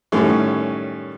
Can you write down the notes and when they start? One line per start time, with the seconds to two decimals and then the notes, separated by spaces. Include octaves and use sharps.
0.12 F#2 A2 D#3 G3 A3 C#4